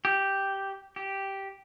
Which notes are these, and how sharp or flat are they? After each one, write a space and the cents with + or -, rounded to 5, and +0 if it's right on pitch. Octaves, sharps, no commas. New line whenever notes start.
G4 -5
G4 -5